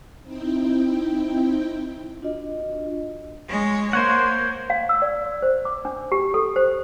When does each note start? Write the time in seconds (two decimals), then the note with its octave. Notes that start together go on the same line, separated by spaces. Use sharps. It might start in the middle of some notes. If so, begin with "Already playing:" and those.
0.24 C4 D#4 E4 G5
2.22 D4 F4 F#4 D#5
3.48 G#3 C#5
3.93 A#3 C5 C#5 F#5
4.70 F5
4.89 E6
5.02 D5
5.42 C5
5.65 D6
5.85 D4
6.12 G4
6.34 A4
6.56 C5